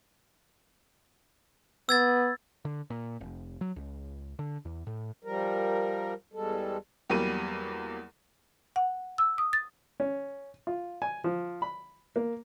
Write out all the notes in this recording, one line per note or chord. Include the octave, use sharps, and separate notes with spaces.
B3 E6 G#6 A6
D3
A#2
F1
F#3
C#2
D3
E2
A2
F3 G3 A#4
E2 G3 G#3 A4
E2 F#3 G3 A#3 D#7
F#5
E6
D#6
A6
C#4
F4
G#5
F3
B5
A#3